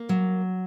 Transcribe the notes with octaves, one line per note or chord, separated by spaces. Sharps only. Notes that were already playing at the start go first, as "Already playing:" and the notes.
Already playing: A#3
F#3